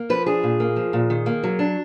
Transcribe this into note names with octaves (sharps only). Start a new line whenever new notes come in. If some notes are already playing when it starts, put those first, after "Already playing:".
Already playing: A#3
F3 B4
D4 G#4
A#2
A#3
F3
A#2
D#3
A#3
F#3
D4